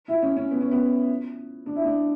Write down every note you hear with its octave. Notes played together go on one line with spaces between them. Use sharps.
E4
C#4
C#4
B3
C#4
B3
D4
E4
D4